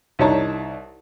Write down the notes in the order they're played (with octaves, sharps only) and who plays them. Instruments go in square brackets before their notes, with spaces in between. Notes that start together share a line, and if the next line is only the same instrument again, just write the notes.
[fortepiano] C2 D4 D#4 C#5 A5 A#5